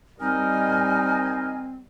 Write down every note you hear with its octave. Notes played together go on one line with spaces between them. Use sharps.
G3 C4 D#4 A#4 D#5 G#5